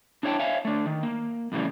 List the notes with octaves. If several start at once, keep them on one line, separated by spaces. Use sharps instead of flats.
D4 E4 C#5 E5 G5 A5
C#5 E5 F5 G#5
A3 D4
D#3
A#3
F2 A2 C#3 E3 G3